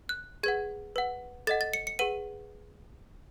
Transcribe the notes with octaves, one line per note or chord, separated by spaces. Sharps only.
F#6
G#4 B4 F#5 G#6
B4 F#5
A4 D#5 F#5 A6
A6
C#7
C#7
G#4 B4 F#5 D#7